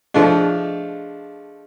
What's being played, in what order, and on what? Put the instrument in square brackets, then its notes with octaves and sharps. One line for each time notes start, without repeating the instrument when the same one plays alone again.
[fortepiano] F3 A3 D4 [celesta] G#4 D#5 F5